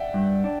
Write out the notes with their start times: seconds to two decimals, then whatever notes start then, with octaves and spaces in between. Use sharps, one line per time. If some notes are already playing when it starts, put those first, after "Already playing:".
Already playing: D5 E5 F#5 G5
0.14 G2
0.44 D4